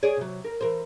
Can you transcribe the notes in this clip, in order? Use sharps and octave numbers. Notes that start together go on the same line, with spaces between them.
G#4 C#5 D5
C3 F#3
A#4
E3 A#4 C5